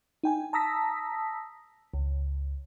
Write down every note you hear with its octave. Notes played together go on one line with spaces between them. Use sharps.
D#4 G5 G#5
A5 A#5 D#6 E6 A#6 B6
C#2